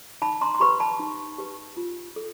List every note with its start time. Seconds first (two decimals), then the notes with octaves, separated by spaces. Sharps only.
0.22 D#4 A5 B5
0.41 A#5 C6
0.55 C6
0.60 G4 B4 B5 C#6
0.80 A5 B5
0.99 D#4
1.38 G4 B4
1.77 F4
2.16 A4